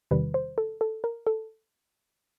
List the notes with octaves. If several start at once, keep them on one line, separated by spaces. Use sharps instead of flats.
E2 C3 D#3 G3 B4
C5
A4
A4
A#4
A4